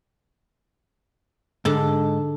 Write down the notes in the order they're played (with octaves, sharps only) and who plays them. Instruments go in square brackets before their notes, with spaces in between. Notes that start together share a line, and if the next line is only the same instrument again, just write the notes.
[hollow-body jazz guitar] G#2 [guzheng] D3 A4